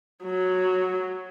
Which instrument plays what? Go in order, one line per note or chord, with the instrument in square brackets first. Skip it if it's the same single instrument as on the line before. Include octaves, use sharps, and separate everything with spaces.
[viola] F#3